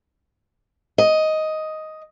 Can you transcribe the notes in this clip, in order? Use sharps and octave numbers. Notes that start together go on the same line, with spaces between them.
D#5